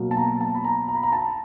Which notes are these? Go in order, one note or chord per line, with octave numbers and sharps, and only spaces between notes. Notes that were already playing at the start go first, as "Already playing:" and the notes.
Already playing: B2 F#3 A#3
A5
A#5
A5
B5
A#5
A#5
B5
A#5
A5